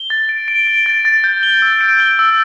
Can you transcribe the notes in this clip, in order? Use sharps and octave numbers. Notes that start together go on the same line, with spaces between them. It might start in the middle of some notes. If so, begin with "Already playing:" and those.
Already playing: G7
A6
D7
D7
D7
A6
A6
G6
G7
E6
D7
G7
E6